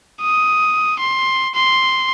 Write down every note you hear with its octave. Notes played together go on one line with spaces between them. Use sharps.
D#6
C6
C6